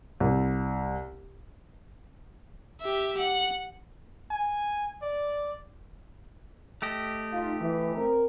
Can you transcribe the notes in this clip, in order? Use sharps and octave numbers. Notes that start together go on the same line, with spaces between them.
C2
G4 E5
F#5
G#5
D5
A3 G4 D#5
D#4 F4
E3
C4 A#4